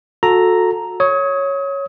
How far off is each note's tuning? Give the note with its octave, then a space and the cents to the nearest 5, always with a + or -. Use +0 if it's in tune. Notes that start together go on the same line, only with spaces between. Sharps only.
F#4 -30 A4 +0 A#5 +0
C#5 +0 D#6 +35